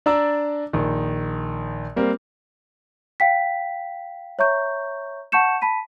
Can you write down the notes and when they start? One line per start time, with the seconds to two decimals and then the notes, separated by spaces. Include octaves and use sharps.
0.06 D4 D5 A#5 E6
0.73 A#1 D#3
1.96 G3 A#3 C4
3.20 F5 G5 B6
4.39 C#5 E5 A#5 C#6 G6
5.32 F#5 A5 C#6 G6 C#7 E7
5.62 A5 B5 B6 D#7